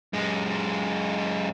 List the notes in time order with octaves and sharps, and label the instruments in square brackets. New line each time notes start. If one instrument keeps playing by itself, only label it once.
[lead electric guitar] F#2 G#3